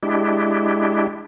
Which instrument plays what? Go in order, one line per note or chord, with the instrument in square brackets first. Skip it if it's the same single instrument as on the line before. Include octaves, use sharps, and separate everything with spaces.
[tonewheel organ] G#3 D4 E4 G4